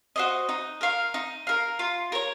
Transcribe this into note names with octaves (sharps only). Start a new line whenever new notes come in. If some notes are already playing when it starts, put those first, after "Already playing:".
F#4 C5 D#5
D#4
A#4 F5
D#4
A#4 F5
F4
A#4 C#5